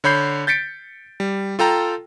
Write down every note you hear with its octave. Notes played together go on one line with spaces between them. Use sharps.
D3 C#5 B5 G6 C7
G6 A6 B6 C#7 D7
G3
F4 A4 G5 A#5